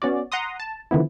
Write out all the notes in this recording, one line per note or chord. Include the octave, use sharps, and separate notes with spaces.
B3 C#4 F#4 D5
F#5 A#5 C6 D#6
A5
D3 D#3 F3 B3 E4